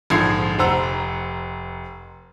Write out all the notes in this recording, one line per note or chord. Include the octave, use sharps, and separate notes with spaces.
A#1 G#2 D3 F3 G#6 C7
F1 C5 F#5 A#5 E6